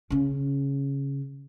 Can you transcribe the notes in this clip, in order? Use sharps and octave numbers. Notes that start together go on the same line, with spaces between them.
C#3 C#4